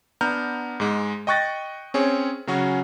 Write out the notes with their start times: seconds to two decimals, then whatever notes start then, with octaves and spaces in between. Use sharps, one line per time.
0.21 B3 D4 A#5 F6 G6
0.80 G#2 G#3
1.27 D#5 G5 C#6 F#6 A6 A#6
1.94 C4 C#4 G#4 C#5
2.47 C#3 F#3 C#4 F#4